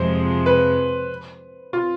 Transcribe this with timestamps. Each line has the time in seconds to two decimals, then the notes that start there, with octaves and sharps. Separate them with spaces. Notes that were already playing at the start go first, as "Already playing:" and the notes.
Already playing: F2 C3 F3 G#3 C5
0.46 B4
1.73 F4